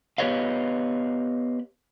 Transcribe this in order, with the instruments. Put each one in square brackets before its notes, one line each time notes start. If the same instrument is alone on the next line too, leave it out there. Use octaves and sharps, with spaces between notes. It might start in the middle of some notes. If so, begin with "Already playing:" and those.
[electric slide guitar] B3 G4 B4 C#5 D#5 F5